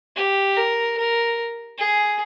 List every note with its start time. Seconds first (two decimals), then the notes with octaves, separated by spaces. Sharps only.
0.16 G4
0.57 A#4
0.97 A#4
1.78 G#4